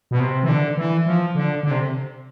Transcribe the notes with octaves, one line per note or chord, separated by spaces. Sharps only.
B2
C3
E3
D3
E3
F3
D3
D3
C3